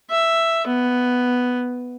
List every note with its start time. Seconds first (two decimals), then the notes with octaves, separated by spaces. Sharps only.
0.10 E5
0.67 B3